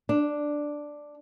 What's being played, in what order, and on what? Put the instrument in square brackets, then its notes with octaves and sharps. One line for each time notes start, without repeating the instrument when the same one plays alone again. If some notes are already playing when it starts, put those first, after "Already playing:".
[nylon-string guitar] D4